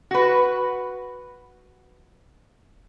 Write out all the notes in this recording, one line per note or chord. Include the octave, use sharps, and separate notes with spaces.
F#4 B4